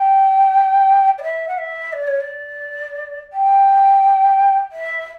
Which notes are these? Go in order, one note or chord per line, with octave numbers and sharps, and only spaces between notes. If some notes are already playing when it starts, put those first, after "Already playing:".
Already playing: G5
D5
E5
F#5
E5
D5
C#5
D5
G5
E5